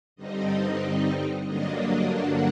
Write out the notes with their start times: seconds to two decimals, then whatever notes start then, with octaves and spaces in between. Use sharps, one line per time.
0.16 G2 D3 G3 C4 D#4 D#5
1.45 G2 D3 F#3 A#3 D4 D#5
1.78 D#5
2.11 F#5